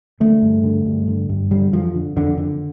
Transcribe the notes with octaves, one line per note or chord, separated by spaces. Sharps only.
D3 A3
G2
D3
G2
D3
G2
D3 G3
F2 F3
D3
F2 D3
D3